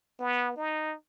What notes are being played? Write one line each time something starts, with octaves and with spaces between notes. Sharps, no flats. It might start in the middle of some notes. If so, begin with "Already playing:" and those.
B3
D#4